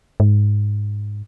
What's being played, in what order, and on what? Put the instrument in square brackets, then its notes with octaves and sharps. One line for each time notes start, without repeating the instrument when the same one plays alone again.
[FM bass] G#2